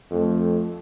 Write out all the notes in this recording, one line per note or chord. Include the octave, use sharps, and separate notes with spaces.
F2 A3